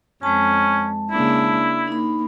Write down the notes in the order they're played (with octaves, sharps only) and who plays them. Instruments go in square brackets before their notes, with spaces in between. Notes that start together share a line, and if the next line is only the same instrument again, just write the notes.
[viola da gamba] F2 [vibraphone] G#3 A5 [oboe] C#4
[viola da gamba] C#3 A#3 D4 [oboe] E4
[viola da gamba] A#3 [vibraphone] D#4 B5